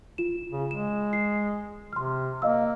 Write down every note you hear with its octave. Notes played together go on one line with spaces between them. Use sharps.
F4 E7
C#3
G#3 E7
C7
C3 C6 F6
A#3 D#5 F5 E6